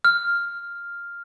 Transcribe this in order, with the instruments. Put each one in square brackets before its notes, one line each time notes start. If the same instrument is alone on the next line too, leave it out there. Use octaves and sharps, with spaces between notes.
[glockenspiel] F6